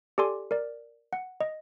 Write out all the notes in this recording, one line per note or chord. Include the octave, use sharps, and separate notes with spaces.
G4 A4 D5 G#5 C6 D6
A#4 D5
F#5
D#5